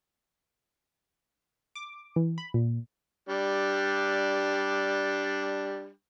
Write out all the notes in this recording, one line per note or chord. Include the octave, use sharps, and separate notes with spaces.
D6
E3
B5
A#2
G3 D4